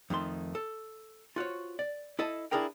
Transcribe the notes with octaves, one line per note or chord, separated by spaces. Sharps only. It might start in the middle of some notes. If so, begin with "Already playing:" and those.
F2 D#3 A3 C6
A4
F4 F#4 C5 C#5
D5
E4 A4 D#5 A5
D4 E4 G#4 A#4 G5